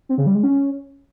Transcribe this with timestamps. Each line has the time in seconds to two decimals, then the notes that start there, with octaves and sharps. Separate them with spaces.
0.09 C4
0.18 C#3
0.26 G3
0.35 G#3
0.43 C#4